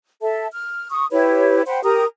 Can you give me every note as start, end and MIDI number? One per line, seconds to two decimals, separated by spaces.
0.21 0.47 69
0.21 0.47 76
0.21 0.47 81
0.52 0.90 89
0.91 1.06 85
0.91 1.06 87
1.11 1.62 64
1.11 1.62 67
1.11 1.62 71
1.11 1.62 73
1.66 1.81 72
1.66 1.81 78
1.66 1.81 79
1.66 1.81 83
1.83 2.04 67
1.83 2.04 70
1.83 2.04 82
1.83 2.04 87